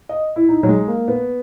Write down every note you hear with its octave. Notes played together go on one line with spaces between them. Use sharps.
D#5
E4
D#4
F#3
G#3
A#3
B3